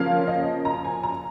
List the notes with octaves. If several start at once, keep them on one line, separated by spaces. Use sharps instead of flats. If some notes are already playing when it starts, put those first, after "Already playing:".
Already playing: C#3 F3 A#3 C#4 F5
D#5
A#5
G#5
A#5